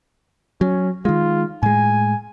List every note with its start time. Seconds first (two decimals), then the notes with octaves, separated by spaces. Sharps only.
0.61 F#3 C#4
1.05 D#3 G#3 F4
1.63 A2 G#3 G#5